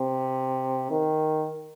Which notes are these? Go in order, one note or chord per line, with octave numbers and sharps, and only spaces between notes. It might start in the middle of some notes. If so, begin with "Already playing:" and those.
Already playing: C3
D#3